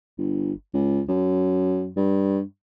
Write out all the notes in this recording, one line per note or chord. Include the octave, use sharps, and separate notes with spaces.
G1
C#2
F#2
G2